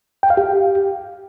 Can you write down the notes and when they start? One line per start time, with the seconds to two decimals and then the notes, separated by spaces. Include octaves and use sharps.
0.23 G5
0.30 F5
0.37 G4